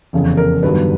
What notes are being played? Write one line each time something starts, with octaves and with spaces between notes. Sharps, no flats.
F1 E2 C#3
A#4
G1 G2 D#3 F#3 B4